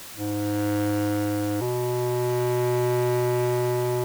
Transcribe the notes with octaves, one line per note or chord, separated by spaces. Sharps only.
G#2
B2